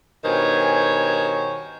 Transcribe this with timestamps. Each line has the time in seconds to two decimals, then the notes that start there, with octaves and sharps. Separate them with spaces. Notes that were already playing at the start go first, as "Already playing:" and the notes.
0.24 G2 B2 D#3 C5 C#5 G#5